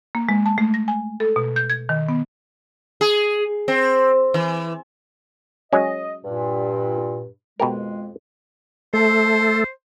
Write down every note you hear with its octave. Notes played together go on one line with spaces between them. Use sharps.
A#3
G#3
A5
A3
A#6
G#5
A4
B2
G6
G#6
D#3
B3
G#4
C4
E3
F#3 G#3 C#4 D#5
G2 A#2
F2 B2 G#3 G4 A#4
A3 A4 C5